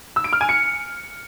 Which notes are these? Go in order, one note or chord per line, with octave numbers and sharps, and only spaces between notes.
E6
D7
F6
G#5
C#7